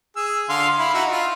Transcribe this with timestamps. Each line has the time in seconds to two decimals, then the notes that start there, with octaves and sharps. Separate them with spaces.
0.17 G#4 E6
0.49 D3 F5 C6
0.79 E4 B5
0.94 D#4 F#4 E5
1.10 F4